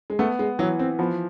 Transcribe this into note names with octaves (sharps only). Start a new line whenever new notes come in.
G#3
A3 B3
G#3
E3 F#3
C4
F3 B3